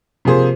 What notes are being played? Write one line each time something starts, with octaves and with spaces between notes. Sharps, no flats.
C3 F3 A#3 G#4 C5